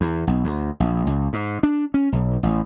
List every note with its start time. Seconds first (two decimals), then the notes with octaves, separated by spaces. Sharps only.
0.01 E2
0.27 B1
0.44 D2
0.80 A#1
1.07 C#2
1.33 G#2
1.63 D4
1.94 C#4
2.12 B1
2.43 A1